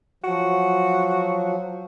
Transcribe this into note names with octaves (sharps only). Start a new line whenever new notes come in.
F3 F#3 F#4